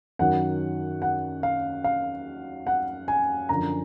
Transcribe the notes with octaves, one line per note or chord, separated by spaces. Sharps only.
F#2 D#3 F#3 F#5
F#5
F5
F5
F#5
G#5
F#2 D3 F3 A#5